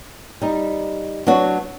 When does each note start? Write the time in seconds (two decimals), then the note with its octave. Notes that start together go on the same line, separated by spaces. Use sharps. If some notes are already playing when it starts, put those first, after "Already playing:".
0.42 G3 D#4
1.27 F#3 B3 D4 F#4